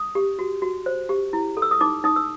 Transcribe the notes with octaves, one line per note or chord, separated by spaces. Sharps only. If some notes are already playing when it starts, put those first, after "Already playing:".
Already playing: D#6
G4
F#4
F#4
C5
G4
E4
A4
E6
D#6
D#4 D6
D#4 D#6
E6